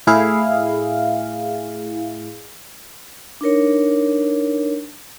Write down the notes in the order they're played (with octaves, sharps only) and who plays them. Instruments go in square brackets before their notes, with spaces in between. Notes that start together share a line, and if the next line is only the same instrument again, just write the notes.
[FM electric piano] A2 E4 G#4 F5
[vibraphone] D4 D#4 A#4 C#5